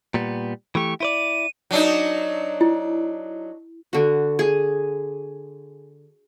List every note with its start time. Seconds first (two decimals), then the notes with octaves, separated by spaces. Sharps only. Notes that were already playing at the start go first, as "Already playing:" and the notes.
0.14 A#2 G3 B3
0.75 E3 A3 G4 C#6
1.00 E4 C5 D5 D#7
1.71 F#3 D4 D#4
2.61 E4
3.93 D3 F#4
4.39 G#4